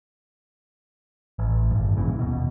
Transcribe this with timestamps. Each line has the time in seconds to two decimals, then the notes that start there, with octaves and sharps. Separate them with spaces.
1.39 A1
1.71 G#1 G2
1.96 A#1 A#2 C#3 E3
2.19 D#1 B2